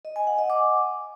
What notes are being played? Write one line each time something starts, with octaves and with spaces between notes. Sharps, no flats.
D#5
G#5
F#5
D#5
D6